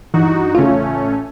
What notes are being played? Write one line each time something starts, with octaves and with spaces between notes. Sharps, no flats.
G2 E3 D#4 F#4
A1 C#3 A3 C#4 F4